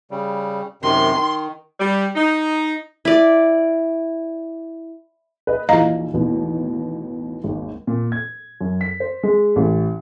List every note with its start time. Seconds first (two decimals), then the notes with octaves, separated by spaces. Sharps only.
0.11 C#3 G3
0.82 F#2 C3 D#3 C6
1.16 D#3
1.79 G3
2.15 D#4
3.05 E4 D5
5.47 B4 D#5
5.69 A#1 D#2 E3 D#5 F5 A#5
6.14 A1 D#2 B2
7.44 G#1 D#2
7.87 A#2
8.12 G#6
8.61 F#2
8.81 B6
9.00 C5
9.23 G#3
9.56 A1